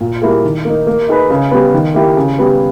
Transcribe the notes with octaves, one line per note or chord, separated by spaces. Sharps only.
A#2
G3 A#3 E4 G#4
D#3
A#3 D#4
A#3
D#4 G#4 B4
C#3
G3 B3
D#3
A#3 E4 G4
C#3
G3 B3